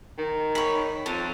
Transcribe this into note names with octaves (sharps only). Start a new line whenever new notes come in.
D#3
C#5 B5
F2 A4